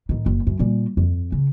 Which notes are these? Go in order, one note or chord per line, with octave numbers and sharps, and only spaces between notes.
A2 D#3
F#1
F#2
A#2 G3
F2
C#3